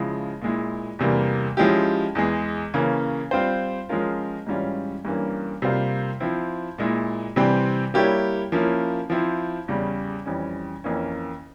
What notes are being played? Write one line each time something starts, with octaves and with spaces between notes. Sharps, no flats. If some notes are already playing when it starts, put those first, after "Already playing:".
Already playing: C#3 F3 G#3 E4
A#2 G#3 E4
E2 C3 E3 G3 A#3
F3 G#3 C#4 E4 G4
E2 E3 G#3
C#3 E3 A#3 C#4
G3 C4 F4 C5
F3 G#3 C#4 F4 A#4
G#2 E3 G3 C#4 F4
G2 E3 A#3 C#4
C3 G3 A#3 F4 C5
F3 C4 E4
A#2 G#3 E4
C3 E3 G3 C4
G3 A#3 E4 G4 C#5
F3 A#3 C#4 E4
F3 C4 E4
E2 C#3 G3 C#4
F2 E3 G3 C#4
F2 E3 A#3 C#4